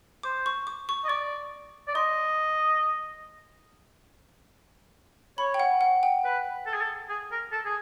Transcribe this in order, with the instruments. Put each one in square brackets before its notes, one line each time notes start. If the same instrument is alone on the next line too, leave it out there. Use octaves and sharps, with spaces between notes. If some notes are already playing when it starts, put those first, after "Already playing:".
[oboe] C5 [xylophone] D6
[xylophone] C#6
D6
C#6
[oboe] D#5
[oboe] D5 [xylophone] C#6
[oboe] D5
[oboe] D#5 [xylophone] C6
[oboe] C#5 [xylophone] B5
[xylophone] G5
F#5
F#5
G5
[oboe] B4
A4
G#4
A4
G#4
A#4
A4
G#4